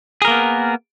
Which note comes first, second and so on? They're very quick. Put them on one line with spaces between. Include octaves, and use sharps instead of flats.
G#4 A#4 A#3 B3